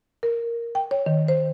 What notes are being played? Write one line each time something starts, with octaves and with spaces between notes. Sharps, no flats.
A#4
G5
C#5
D#3
C5